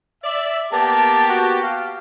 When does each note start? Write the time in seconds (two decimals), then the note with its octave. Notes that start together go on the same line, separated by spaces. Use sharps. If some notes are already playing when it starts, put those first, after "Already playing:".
0.24 D5 E5
0.73 A#3 B3 G4 A5
1.29 F#4
1.63 F5